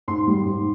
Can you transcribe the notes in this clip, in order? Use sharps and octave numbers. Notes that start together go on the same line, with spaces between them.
G#2 C6
D#3 G3
G#2